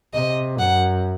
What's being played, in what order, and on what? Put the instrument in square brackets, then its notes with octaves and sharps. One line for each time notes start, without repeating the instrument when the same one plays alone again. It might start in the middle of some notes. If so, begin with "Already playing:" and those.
[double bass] C3 [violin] D#5
[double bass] F#2 [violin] F#5